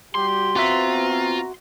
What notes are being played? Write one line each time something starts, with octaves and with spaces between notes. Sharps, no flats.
G3 F#4 G4 C6
B3 C4 F4 F#4 E5 A#5